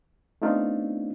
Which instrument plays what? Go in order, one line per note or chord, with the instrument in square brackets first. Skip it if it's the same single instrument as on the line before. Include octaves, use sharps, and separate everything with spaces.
[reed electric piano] A3 B3 C4 D4 D#4 F4